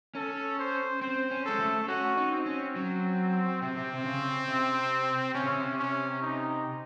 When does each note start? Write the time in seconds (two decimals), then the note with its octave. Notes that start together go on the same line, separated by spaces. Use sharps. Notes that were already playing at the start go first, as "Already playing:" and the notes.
0.15 C#4 A4
0.59 C5
1.01 C4 C5
1.31 C#4
1.46 G#3 A4
1.60 A3
1.88 C#4 F#4
2.17 D#4
2.32 C4
2.46 C#4
2.76 F#3
3.62 C3 C4
3.77 C3
3.94 C3
4.05 C#3
4.48 C3
5.35 C3 C#4
5.44 C#3
5.53 C3
5.78 C#4
6.22 D#4